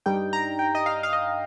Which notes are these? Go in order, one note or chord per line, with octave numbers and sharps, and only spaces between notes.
G2 G3 D#4 G5
A#5
G5
D#5
F5
F5
D#5